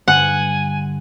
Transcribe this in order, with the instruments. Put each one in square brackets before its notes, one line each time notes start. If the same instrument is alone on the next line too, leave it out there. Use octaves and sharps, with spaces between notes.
[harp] G2 D3 F#6 [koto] F#5 [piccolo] G#5